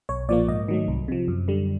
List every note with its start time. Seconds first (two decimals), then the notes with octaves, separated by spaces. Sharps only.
0.09 B1 C#5
0.29 A#2 F3 A#3 D5
0.48 G#2 D#5
0.68 D#3 F#3 A3
0.88 C2
1.08 C3 F3
1.28 F#2
1.48 D3 G3